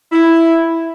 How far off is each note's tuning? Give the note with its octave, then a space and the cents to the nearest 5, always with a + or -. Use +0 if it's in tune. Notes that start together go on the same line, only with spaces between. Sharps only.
E4 +0